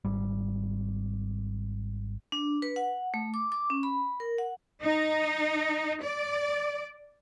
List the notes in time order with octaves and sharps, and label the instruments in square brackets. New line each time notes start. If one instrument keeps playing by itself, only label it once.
[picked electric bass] G#1 G3
[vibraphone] D4
B4
F#5
A3
D6
D6
C#4
B5
A#4
F#5
[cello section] D#4
D5